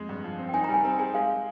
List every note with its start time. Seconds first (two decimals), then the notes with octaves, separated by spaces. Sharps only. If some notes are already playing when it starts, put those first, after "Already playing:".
Already playing: F2 G#3
0.09 G2
0.24 F3
0.39 C4
0.49 G5
0.54 D#4 G#5
0.64 A#5
0.69 G3
0.74 G#5
0.84 C4 A#5
0.99 G#4 G#5
1.15 G#3 F5